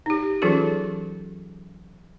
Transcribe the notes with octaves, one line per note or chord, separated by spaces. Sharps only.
D#4 G4
E3 F#3 C#4 F4 G#4 A4